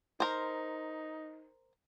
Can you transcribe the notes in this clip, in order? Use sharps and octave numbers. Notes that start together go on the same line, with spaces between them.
D#4 A#4 C5